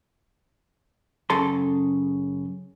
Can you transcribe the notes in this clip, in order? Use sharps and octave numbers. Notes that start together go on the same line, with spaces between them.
F#2 C#3 A4 A5 C6